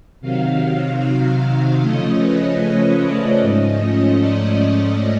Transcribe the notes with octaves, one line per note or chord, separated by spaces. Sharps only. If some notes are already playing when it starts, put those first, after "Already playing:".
C3 D#3 F#3 F5
F5
F5
C#3 F3 A3 C#4 D#5
B4
C#5
D5
G#2 F3 A3 C#4 D#5
D#5
D5